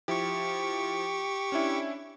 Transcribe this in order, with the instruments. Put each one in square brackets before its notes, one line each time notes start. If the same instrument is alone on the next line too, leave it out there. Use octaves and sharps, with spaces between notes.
[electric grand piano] F3 E4 [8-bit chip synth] G4 C#6
[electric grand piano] C#4 D4 E4